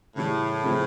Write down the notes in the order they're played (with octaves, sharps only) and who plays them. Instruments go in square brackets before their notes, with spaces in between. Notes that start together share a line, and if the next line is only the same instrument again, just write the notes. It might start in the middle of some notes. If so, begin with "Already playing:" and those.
[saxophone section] A2 [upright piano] C#3 E3 G3
[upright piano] C#3 F3 A3 C4